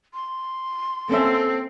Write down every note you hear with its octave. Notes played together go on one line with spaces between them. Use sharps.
C6
A#3 C4 C#4 A4 E5